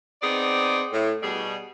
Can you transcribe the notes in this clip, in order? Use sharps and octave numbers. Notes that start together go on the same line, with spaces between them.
B3 C4 D#4 G#4 D5
A2
B2 G3 G#4